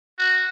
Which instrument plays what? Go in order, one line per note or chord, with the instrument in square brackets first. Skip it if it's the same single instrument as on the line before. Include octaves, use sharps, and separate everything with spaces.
[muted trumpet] F#4